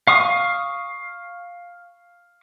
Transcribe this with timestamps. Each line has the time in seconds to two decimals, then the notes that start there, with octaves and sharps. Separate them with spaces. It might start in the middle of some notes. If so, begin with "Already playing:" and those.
0.07 F5 C#6 D#6